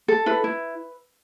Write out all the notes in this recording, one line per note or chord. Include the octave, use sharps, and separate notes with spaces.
A4
E4 B4
E4